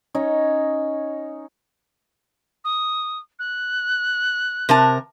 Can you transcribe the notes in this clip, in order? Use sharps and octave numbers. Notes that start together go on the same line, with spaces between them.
C#4 D#4 C#5
D#6
F#6
C3 A#4 A5